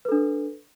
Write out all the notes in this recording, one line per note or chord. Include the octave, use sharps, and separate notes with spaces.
D4 A4 B4